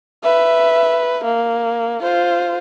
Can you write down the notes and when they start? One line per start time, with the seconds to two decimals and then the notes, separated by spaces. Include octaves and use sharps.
0.23 B4 E5
1.25 A#3
2.02 F4 C5